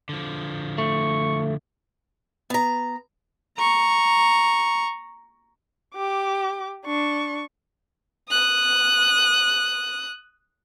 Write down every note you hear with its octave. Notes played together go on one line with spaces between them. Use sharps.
D3 F3
A3 C#6
B3 A#5
A#5 C#6
G4 D6
D4 C#6
D#6 F#6